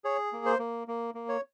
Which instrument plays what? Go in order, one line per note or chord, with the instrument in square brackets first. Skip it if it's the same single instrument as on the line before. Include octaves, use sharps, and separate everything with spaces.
[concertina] G#4 C#5
A#3
C5
A#3
A#3
A#3
C#5